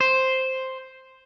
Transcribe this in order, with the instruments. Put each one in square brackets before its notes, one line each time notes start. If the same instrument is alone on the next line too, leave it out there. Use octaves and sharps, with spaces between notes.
[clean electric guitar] C5